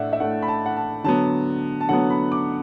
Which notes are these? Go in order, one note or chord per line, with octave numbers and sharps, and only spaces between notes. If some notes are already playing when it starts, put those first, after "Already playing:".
Already playing: A2 A3 D4 D5 E5 F#5
E5
A2 A3 D4 F#5
B5
A5
F#5
A5
D3 F#3 B3 A5
A5
D3 F#3 B3 F#5
B5
D6